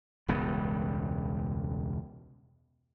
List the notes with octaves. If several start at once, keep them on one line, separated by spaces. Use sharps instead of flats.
E1 C#2 G2 B3